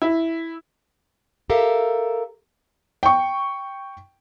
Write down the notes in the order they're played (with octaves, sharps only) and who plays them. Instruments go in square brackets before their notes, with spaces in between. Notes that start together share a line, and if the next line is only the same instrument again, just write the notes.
[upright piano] E4
[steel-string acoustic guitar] G4 A4 A#4 E5 F5
[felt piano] G5 C#6